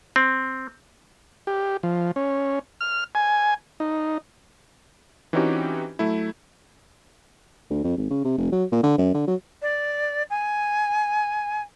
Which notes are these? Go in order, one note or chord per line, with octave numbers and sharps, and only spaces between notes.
C4
G4
F3
C#4
F6
G#5
D#4
E3 C4 C#4 D#4 F#4 G4
F#3 A3 E4
D2
F2
G#1
C#3
C3
F1
F#3
A#2
D3
F#2
D3
F#3
D5
G#5